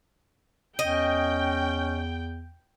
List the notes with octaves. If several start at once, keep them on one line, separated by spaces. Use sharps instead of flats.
E2 C#4 D#5 G5